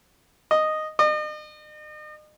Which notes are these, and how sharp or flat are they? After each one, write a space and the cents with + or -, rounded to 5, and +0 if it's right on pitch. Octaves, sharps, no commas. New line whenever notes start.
D#5 -5
D#5 -40